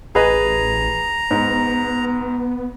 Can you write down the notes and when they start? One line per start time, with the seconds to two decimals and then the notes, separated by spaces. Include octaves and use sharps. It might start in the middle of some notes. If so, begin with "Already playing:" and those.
0.15 A1 G#4 B4 D#5 A#5
1.31 G#2 B3